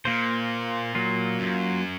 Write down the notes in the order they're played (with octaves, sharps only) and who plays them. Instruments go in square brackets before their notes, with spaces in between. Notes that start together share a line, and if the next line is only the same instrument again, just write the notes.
[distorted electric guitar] A#2 [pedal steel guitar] A#3 F4 C5
[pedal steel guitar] F#3 A#3 F4
[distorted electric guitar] F#2